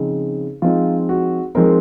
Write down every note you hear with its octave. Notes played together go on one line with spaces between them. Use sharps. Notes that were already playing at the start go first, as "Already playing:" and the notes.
Already playing: C#3 F3 C4 D#4
F3 G#3 C4 D#4 F4
F#4
F3 G#3 C4 D#4 A#4